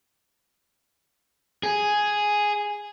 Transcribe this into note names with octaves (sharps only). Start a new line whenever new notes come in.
G#4